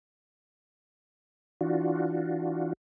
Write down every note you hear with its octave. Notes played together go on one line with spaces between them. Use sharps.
E3 D4 F4 F#4